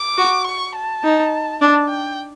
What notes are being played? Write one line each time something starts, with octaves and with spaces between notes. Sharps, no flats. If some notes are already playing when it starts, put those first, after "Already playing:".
Already playing: D6
F#4
C#6
A5
D#4
D4 A5
G5